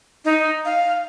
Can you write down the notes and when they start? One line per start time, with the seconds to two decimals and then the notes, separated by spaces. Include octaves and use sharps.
0.25 D#4
0.65 F5